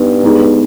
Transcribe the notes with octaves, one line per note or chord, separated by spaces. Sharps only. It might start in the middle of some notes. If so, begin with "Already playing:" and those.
Already playing: G2 B3 D#4
G#3 B3 D#4 G#4